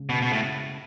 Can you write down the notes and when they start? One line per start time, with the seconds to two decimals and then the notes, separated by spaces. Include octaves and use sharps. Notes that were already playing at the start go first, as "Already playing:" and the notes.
Already playing: C#3 G#3
0.09 B2
0.22 B2
0.33 A2